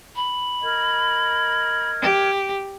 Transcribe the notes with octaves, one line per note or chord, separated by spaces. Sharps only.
B5
A#4 D#5 G#6
G4